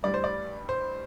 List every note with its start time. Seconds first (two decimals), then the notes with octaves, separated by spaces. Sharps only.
0.03 A1 G2 G3 D5
0.14 C5
0.24 D5
0.69 C5